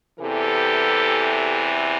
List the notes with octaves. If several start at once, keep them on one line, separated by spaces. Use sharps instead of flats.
E2 C3 E3 G4 A4